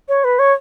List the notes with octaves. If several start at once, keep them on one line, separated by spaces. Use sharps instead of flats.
C#5
B4
C#5